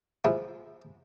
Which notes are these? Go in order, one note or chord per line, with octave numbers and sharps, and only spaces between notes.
F3 G#3 E4 F4